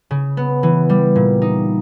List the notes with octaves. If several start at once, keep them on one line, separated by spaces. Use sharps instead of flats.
C#3
B3
E3
G3
A#2
D#4